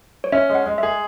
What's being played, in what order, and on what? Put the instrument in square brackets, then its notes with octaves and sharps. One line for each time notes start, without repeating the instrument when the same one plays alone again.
[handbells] C#5
[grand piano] C#4 [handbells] E5
[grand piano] G#3
[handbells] F#5
[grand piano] G#3
[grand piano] G#4 [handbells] E5